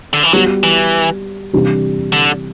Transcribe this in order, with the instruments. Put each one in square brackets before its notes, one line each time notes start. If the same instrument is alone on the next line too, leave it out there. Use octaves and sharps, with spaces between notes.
[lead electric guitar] D3
E3
[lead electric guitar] F#3 [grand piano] G3 B3 F#4
[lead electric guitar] E3
[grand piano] C3 E3 G3 D4 G4
[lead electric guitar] D3